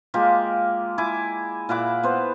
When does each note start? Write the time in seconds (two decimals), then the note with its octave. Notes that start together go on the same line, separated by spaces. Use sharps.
0.14 G#3 A#3 F4 G4
0.98 E4 G#5 D6
1.69 A#2 E4 F#5 D6
2.03 B3 C5